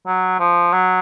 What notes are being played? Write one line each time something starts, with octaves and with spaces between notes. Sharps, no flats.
F#3
F3
F#3